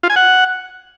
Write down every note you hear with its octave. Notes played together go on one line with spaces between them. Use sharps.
F4
G#5
F#5